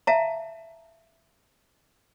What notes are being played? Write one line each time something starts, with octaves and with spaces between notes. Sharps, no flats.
E5 F5 A5 A#5